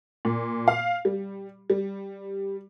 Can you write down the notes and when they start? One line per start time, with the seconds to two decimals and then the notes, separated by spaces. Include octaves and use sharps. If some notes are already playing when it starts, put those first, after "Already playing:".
0.25 A#2
0.68 F5
1.05 G3
1.70 G3